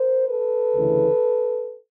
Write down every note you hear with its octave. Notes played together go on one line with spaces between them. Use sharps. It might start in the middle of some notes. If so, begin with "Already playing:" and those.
Already playing: A#4 C5
A4 B4
D2 C#3 E3